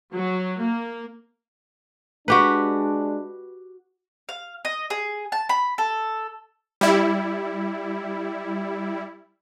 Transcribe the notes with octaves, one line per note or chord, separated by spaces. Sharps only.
F#3
A#3
G#3 D4 F#4 G4 B4
F5
D#5
G#4
A5
B5
A4
G3 E4